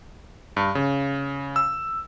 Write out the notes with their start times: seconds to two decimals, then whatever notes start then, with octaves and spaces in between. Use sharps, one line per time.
0.57 G2
0.75 C#3
1.56 E6